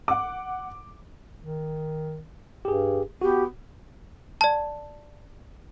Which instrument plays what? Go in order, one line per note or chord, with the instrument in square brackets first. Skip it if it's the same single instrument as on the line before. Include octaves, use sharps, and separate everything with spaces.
[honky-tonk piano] F#5 D6
[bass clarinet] D#3
[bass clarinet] G2 [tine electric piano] G4 G#4
[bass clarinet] B3 [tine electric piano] F#4 [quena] G4
[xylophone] D5 A5